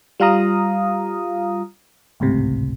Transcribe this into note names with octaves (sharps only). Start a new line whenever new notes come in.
G3 F4 F5 A#5 D#6
G#1 C#2 A2 C3